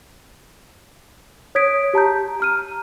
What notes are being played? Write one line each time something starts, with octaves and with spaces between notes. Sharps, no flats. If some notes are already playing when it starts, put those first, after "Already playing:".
C#5 D#6 G#6 B6 D7
G4 A5 A#5 G6
A#5 F6 D#7